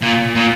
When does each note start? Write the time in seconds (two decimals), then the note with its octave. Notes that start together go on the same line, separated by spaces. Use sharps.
0.02 A#2
0.35 A#2